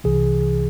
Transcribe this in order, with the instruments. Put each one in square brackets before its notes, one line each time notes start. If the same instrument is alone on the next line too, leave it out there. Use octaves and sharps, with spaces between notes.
[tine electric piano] C2 C3 E3 G#4